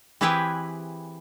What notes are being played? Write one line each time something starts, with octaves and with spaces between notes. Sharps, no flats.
E3 C4 E4 G4 G#4 B4